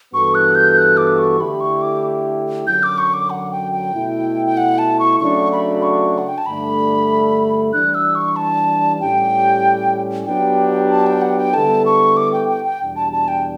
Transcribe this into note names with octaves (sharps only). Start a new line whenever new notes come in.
G2 E3 B3 F#4 A4 C#6
F#6
G6
F#6
D6
C#6
D3 A3 E4 G4 B5
C#6
D6
F#2 D3 F#3 G6
D6
C#6
D6
F#5
G5
G5
B2 A3 E4
G5
F#5
A5
C#6
C#3 F#3 A3 D4 F#4 C#6
B5
C#6
F#5
G5
A5
G2 D3 A3 D4 B5
E3 G3 D4 F#6
E6
C#6
A5
A2 G3 C#4 G4 G5
F#3 B3 D4 G4 G5
A5
G5
F#5
G5
D3 G3 B3 E4 A4 A5
C#6
D6
G5
G5
G5
E2 B2 G3 D4
A5
A5
G5